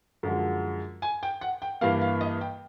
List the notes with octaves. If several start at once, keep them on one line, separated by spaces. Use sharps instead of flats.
F#2 D3 F3 G#3
G#5
G5
F#5
G5
G2 E3 G3 A#3 F5
F5
D#5
G5